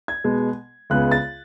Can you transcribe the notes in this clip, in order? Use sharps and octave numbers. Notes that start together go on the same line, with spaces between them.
G#6
B2 G#3 B3
C#2 C#3 G#3 B3 F#6
A6